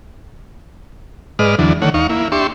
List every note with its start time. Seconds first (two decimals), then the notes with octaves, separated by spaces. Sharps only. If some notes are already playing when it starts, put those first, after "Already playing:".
1.39 G#2 G#3 B4 D5 D#5 F6
1.59 E2 D3 E3 F#3 D4
1.82 D3 D#3 A3 C#5 F#5
1.94 D#2 D#4 F5 C#6
2.09 A#3 E4
2.32 D4 G4 E5 C6 C#6